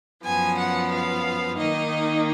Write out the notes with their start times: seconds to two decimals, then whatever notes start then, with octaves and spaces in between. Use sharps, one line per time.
0.24 F#2 F3 B3 G#5
0.57 F#5
0.91 F5
1.58 D#3 A#3 D#4 D#5